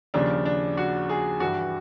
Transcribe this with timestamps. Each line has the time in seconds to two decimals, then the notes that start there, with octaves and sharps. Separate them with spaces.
0.14 D#2 C#3 F3 D4
0.46 D4
0.77 F#4
1.09 G#4
1.40 G2 E3 G3 F#4